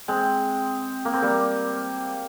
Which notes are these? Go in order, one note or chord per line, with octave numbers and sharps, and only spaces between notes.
G#3 C4
A#3
C4
G3 A#3